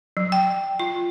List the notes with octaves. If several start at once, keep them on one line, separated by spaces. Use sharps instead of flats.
F#3
G5
F4